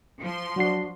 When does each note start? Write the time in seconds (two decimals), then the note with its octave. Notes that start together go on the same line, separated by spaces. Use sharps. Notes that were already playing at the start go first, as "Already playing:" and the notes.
0.21 F3 C6
0.56 F#3 D4 F#4 C7